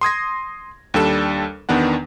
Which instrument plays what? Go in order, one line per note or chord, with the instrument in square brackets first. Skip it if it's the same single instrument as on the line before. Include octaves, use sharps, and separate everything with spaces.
[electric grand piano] C6 D#6 G#6 A#6
D#2 G3 D4 A4 E7
E2 D#3 B3 D4 F#5